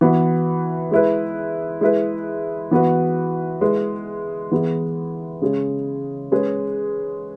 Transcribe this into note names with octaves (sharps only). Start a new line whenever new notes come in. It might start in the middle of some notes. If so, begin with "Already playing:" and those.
E3 B3 F#4 B4
G#3 E4 B4
G#3 E4 B4
E3 B3 F#4 B4
G#3 E4 B4
E3 B3 G#4
C#3 G#3 C#4 G#4
G#3 C#4 G#4 B4